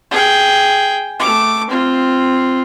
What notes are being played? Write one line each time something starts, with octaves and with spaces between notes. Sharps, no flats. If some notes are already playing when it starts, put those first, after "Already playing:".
G#4 G5
A3 D6
C4 F4